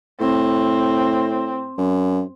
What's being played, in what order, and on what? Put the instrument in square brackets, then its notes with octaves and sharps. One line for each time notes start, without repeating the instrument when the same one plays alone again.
[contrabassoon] A2 [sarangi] C4
[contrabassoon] F#2